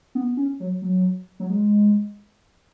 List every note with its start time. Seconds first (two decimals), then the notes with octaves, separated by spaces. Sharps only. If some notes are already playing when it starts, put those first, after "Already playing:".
0.15 B3
0.37 C#4
0.60 F#3
0.82 F#3
1.40 F#3
1.49 G#3